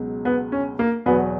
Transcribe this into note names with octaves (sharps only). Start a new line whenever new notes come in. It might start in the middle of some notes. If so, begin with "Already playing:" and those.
Already playing: C#2 B2 F#3
B3
C#4
A#3
E2 B2 F#3 B3